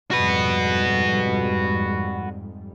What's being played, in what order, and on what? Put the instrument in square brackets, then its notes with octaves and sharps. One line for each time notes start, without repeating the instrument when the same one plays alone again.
[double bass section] F2 G#2 G3 [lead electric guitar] F#4 B4